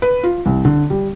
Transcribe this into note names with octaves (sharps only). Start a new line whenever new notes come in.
B4
F4
C2
D3
G3